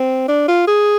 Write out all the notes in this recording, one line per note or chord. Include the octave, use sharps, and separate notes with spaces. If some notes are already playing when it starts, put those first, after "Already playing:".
Already playing: C4
D4
F4
G#4